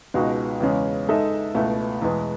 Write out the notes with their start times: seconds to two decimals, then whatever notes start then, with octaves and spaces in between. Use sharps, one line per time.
0.14 C#2 B2 G#3 D#4 F#4
0.60 E2 C#3 G#3 C#4
1.09 G#3 D#4 A4 E5
1.55 C#2 B2 A3 E4 B4
2.02 E2 B2 G#3 B3